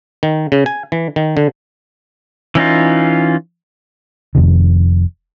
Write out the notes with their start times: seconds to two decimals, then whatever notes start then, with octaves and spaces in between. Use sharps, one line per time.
0.23 D#3
0.52 C#3
0.66 G#5
0.92 E3
1.16 D#3
1.37 D3
2.55 E3 C#4 D#4 F4
4.35 F1 F2 C3 D#3